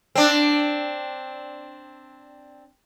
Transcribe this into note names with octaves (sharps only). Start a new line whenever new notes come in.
C4 D4